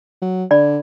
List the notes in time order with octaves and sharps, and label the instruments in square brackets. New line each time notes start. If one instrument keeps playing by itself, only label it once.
[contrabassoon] F#3
[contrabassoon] D3 [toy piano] D5 B5